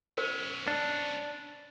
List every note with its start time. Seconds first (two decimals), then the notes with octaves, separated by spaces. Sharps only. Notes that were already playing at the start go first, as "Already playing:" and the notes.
0.18 B3 C#4 A#4 C5
0.68 D4